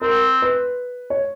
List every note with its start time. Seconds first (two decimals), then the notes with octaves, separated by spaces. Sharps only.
0.01 C4 A#4
0.42 B4
1.10 C#5